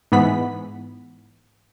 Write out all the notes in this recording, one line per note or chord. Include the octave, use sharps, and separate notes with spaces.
G#2 E3 B3 B5 B6